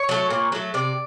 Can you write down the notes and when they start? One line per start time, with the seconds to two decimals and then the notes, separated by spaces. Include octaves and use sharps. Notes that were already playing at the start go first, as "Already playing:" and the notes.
Already playing: C#5
0.09 F#3 A3
0.30 A#2
0.52 F#3 A3
0.74 C3 D5